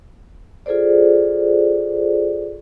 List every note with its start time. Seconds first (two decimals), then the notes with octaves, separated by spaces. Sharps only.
0.66 F4 G#4 A4 C5 D5